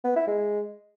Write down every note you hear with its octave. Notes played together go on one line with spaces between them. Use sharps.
B3
E4
G#3